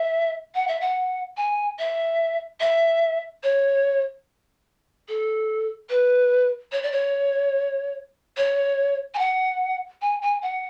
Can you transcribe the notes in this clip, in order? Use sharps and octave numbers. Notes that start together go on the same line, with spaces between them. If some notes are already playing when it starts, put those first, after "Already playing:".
Already playing: E5
F#5
E5
F#5
G#5
E5
E5
C#5
A4
B4
C#5
D5
C#5
C#5
G#5
F#5
G#5
G#5
F#5